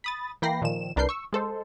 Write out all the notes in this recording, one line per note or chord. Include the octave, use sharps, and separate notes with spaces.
B5 D#6 A6
E3 A#3 G5 B5 A#6 C7
A#2 D#3 F3 E7
C2 D4 A#4 B4 G6 C7
C#6 E6
G#3 A4 C5